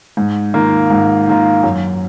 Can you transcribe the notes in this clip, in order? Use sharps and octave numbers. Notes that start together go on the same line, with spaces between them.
G#2
D#3 A#3 F4
G#2
D#3 A#3 F4
F#2